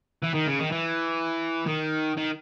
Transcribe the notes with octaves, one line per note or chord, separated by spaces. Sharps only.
E3
D#3
C#3
D#3
E3
D#3
D#3